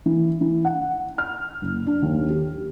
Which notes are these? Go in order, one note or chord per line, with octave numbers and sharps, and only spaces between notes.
E3
E3
F#5
F6
F#1
D4
D#2
G4